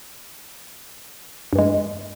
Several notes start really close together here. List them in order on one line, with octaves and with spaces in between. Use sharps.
G2 E3 G#3